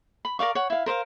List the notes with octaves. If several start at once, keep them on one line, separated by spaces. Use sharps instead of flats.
B5
A#4 D5 F5 C#6
C#5 F#5
E4 F5
A#4 C5 E5 F5